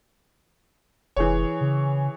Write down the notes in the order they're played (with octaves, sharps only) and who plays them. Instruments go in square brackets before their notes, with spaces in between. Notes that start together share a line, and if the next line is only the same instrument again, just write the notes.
[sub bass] F1 [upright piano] E3 G#4 C#5
[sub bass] C#3